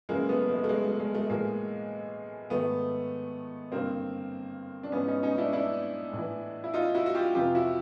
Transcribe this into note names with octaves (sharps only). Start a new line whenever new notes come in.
F#2 C#3 E3 G#3 A#3
A3 B3
A3
A3
G#3
A3
G#3
A3
A2 E3 G#3 A#3
G#2 D#3 A3 B3
G2 D3 A#3 C4
D4
G#2 E3 B3 C#4
C#4 D#4
C#4 D#4
D4 E4
D4 E4
A2 E3
E4
D#4 F4
E4 F#4
F#4
F4 G4
F2 C3 E3 F4 G4
E4 F#4